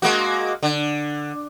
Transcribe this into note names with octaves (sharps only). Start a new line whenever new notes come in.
G#3 A#3 F#4
D3